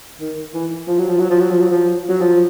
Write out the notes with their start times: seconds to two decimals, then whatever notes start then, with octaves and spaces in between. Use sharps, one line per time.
0.21 D#3
0.54 E3
0.88 F3
0.99 F#3
1.09 F3
1.19 F#3
1.30 F3
1.40 F#3
1.50 F3
1.61 F#3
1.71 F3
2.09 F#3
2.21 F3